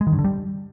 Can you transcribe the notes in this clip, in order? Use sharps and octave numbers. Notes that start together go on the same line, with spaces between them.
G#3
D#3
G2
D3
G3